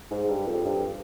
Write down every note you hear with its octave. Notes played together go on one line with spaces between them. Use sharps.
G#2
G2
F2
G2